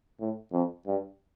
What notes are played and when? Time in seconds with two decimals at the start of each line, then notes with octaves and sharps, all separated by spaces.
0.20 A2
0.53 F2
0.86 G2